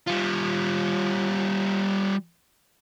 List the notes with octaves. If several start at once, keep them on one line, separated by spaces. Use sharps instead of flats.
G3 F4